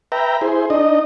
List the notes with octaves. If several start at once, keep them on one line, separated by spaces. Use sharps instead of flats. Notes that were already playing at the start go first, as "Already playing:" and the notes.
B4 E5 G5 A#5
E4 G#4 C5
D4 D#4 D#5